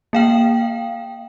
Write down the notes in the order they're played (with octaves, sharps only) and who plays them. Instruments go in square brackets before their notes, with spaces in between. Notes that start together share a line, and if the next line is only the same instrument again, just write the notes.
[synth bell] A#3 F5 G5